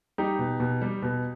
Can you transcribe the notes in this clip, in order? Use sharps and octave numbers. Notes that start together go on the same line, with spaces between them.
G3 D#4 G4
B2
B2
G3
B2